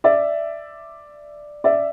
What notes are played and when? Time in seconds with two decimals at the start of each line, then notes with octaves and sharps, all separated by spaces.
0.04 D5 E5
1.64 D5 E5